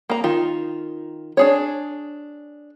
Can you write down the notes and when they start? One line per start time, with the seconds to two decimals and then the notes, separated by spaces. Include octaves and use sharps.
0.10 A#3 A#5
0.24 D#3 F4
1.37 D4 G#4 C#5